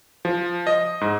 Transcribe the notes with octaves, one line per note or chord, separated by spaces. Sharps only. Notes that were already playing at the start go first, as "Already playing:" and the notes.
F3
D#5
G#2